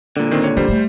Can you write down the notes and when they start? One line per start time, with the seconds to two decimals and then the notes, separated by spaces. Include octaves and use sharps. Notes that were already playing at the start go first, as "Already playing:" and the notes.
0.17 A#2 D3
0.31 D#3 C4
0.44 C#5
0.57 G2 G3 C5
0.69 A3